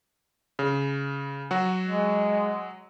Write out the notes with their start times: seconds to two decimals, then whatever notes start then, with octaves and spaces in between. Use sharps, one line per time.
0.59 C#3
1.51 F#3 F#4
1.86 G#3